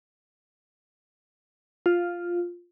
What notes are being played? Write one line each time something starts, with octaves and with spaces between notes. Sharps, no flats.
F4